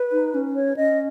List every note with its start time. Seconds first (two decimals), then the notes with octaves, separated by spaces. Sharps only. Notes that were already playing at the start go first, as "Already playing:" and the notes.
Already playing: B4
0.12 D#4
0.34 C#4
0.55 C#5
0.77 C#4 D#5